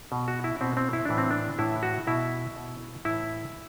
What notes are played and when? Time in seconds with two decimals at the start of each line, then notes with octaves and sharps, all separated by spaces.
0.12 B2
0.28 F#4
0.44 E4
0.61 B2 C4
0.77 C4
0.93 E4
1.05 A2 E3 D4
1.18 C4
1.30 D4
1.58 A2 E3 E4
1.83 F#4
2.07 B2 E4
2.56 B2
3.05 A2 E3 E4